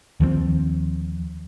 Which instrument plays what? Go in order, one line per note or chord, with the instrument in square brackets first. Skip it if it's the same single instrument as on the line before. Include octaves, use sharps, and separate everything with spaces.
[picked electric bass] D#2 F3 A3 C4